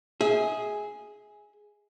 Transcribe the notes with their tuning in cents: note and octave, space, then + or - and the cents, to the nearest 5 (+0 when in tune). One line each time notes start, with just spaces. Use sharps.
G#4 +0 E5 -40